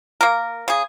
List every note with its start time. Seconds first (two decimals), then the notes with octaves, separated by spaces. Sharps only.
0.21 A#3 A#4
0.68 C#3 G#4